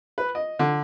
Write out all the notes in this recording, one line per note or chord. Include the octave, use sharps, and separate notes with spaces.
B4
D#5
D3